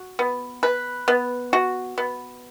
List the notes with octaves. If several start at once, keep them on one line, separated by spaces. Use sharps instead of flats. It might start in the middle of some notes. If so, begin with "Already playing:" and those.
Already playing: F#4
B3
B4
B3
F#4
B3